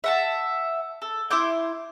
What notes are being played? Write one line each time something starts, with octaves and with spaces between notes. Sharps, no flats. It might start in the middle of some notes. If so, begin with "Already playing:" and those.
E5 F#5 A5
A4
E4 C6 D6 G6